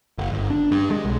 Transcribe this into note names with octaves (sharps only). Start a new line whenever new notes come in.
F#1
G1
D4
G2
G#3
B1